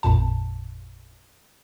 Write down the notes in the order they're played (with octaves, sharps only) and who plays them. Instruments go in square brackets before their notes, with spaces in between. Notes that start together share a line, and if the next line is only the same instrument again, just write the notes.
[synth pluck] A1 F2 A#2 A5